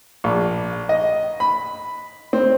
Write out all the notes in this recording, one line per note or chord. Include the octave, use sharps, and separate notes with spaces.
A#1
D#5
B5
C4